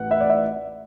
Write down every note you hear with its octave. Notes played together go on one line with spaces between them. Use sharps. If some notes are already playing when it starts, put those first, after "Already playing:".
Already playing: A1 A2 E3 F#5
E5
D5
E5